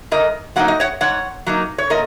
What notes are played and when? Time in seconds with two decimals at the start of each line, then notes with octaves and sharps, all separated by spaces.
0.12 G#2 A#4 D#5
0.56 F#3 A#3 D#4 F#5
0.68 D#5
0.80 C#5 F#5
1.01 G#2 C#5 F#5
1.46 F#3 A#3 D#4
1.78 C#5
1.90 A#2 A#4 D#5